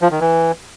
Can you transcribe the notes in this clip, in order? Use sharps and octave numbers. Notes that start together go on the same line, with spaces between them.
F3
D#3
E3